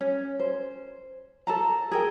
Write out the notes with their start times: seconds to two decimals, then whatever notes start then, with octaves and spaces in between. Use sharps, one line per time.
0.01 C#4
0.39 C5
1.47 A4 A5 A#5
1.91 G#4 A#4 G5